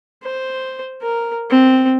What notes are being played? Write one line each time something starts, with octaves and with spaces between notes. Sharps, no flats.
C5
A#4
C4